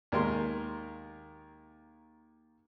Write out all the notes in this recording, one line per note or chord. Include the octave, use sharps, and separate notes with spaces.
D#2 G#3 A#4 C6